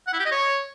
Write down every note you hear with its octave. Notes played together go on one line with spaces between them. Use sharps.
F#5
E4
G4
D#5
C#5